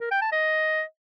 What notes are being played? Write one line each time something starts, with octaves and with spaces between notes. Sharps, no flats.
A#4
G5
A5
D#5